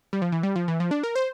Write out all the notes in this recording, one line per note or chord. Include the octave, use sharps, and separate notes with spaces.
G3
F3
E3
G3
F3
E3
F3
D4
A#4
C5